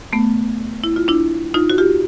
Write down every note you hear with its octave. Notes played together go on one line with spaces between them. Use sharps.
A3 B3
E4
F4
D4 E4
D#4 F4
F#4
F4 G4